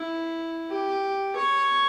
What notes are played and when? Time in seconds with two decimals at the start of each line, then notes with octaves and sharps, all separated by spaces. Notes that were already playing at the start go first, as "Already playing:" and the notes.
Already playing: E4
0.70 G4
1.36 C#5